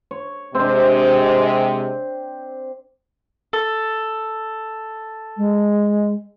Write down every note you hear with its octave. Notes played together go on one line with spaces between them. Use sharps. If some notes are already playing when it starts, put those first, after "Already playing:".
C#5
C3 G#3 C4 D4
A4
G#3